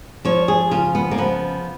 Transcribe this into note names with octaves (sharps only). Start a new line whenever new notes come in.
F3 C#5
G#4
C#3 F4
B3
A#3
F3 B3